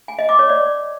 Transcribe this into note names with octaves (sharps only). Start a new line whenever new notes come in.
G#5
D#5
D6
C#5
D5